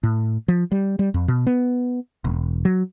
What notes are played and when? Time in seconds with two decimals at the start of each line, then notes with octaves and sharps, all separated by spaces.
0.03 A2
0.48 F3
0.72 G3
0.99 G3
1.14 F2
1.28 B2
1.47 B3
2.24 E1
2.65 F#3